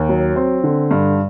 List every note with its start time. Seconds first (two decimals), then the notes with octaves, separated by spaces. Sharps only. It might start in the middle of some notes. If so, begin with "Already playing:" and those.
Already playing: D#2
0.09 F#3
0.36 C4
0.64 D3
0.91 G2